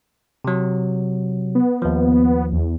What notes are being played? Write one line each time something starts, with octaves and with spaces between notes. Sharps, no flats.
C3 F#3
B3
D#2 F3
E2